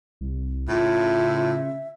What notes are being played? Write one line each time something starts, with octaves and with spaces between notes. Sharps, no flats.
C2
A2 C#3 F4 E5